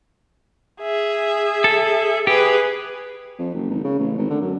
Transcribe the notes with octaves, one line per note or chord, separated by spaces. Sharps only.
G#4 E5
A4
G4 G#4 B4
F2
F#1
G#1
C#3
A1
G#1
D3
F#2